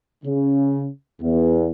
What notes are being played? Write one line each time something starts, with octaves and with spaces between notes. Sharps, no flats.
C#3
E2